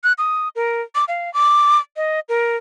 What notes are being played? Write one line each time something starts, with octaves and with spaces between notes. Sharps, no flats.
F#6
D#6
A#4
D6
F5
D6
D#5
A#4